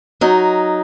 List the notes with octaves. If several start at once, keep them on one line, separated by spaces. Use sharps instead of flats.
F#3 D#4